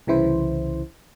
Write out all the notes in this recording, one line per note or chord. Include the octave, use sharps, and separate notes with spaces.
C2 C#3 E3 E4 C5